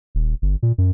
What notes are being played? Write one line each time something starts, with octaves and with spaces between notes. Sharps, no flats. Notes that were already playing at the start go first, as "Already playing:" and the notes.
D#1
G1
A#2
F#2